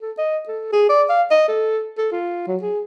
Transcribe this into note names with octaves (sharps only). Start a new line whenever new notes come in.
A4
D#5
A4
G#4
D5
F5
D#5
A4
A4
F4
F#3
G#4